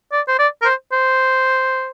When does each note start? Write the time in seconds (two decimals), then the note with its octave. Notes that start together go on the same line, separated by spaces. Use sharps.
0.12 D5
0.28 C5
0.39 D5
0.62 A#4
0.65 C5
0.92 C5